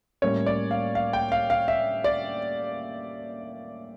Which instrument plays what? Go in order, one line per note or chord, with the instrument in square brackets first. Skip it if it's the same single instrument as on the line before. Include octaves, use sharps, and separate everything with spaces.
[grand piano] A2 G3 A#3 C#4 C#5
D5
F5
F5
G5
F5
F5
E5
D5